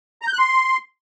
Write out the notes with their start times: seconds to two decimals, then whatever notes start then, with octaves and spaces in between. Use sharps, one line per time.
0.22 A#5
0.27 G6
0.33 F#6
0.38 C6